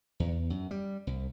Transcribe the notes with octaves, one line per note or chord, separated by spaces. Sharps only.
E2
F#2
G3
C2